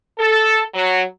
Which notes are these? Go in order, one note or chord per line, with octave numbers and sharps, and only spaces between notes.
A4
F#3